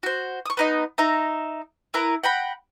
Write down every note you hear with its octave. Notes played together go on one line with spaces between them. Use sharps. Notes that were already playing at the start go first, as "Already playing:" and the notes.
F#4 C5
C#6 D#6
B3 D#4 D#5
D#4 E5 A#5
E4 A#4 B4 A#5
F#5 G5 A#5 B5